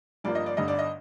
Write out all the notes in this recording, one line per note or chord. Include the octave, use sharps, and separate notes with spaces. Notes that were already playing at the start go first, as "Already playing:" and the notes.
G1 G2 F3 A#3 D5
D#5
D5
G1 G2 D3 D#5
D5
D#5